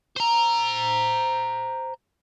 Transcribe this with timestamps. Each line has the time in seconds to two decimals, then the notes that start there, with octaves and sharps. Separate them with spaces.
0.16 C5 A#5